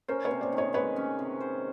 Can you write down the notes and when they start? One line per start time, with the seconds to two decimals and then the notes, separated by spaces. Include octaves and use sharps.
0.08 C#4 A#4 C5
0.25 B4 C#5
0.31 C3
0.41 C5 D5
0.52 D#3
0.58 C#5 D#5
0.74 G#3 B4 C#5
0.96 C#4
1.19 C3
1.40 C5